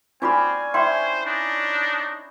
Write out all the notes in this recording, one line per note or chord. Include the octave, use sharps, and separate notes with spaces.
C4 C#4 D#4 F4 D5 G#5 B5
E4 C5 G5 C6
D4 D#4